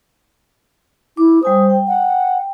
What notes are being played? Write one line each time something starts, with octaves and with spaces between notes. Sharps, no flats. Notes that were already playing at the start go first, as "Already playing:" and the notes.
E4 D6
G3 C5 G#5 D#6
G5
F#5